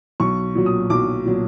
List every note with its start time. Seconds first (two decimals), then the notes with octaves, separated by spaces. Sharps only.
0.20 B1 C#6
0.55 A#2 F#3
0.66 D#6
0.90 B1 D6
1.25 A#2 F#3